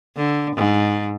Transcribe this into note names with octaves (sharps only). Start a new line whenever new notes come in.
D3
G#2